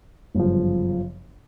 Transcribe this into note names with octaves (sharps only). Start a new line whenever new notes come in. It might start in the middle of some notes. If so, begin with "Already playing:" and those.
G1 F#2 C#3 F3